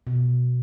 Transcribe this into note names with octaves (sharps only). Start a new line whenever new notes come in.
B2